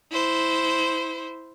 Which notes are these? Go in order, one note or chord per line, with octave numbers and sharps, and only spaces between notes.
E4 C5